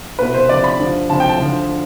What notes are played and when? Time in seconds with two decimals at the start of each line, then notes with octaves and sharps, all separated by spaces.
0.19 C2 B2 B4
0.34 C5
0.49 D2 C3 F3 D5
0.64 B5
0.79 G2 D3 F3
1.10 D2 C3 F3 A5
1.20 G5
1.29 A5
1.40 D2 D3 F3